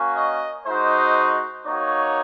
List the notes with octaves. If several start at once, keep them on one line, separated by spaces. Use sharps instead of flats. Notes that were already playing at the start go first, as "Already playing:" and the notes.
Already playing: A#3 C#4 F#4
D#5
G#3 D#4 F#4 C5
A#3 D#4 F#4 C#5